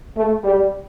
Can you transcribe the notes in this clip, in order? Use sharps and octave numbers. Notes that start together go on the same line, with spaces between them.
A3
G3